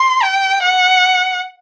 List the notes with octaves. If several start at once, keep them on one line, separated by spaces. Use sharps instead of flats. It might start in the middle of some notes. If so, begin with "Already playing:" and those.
Already playing: C6
G5
F#5